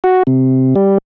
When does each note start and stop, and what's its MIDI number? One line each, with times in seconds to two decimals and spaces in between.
0.04 0.23 66
0.27 0.74 48
0.76 0.98 55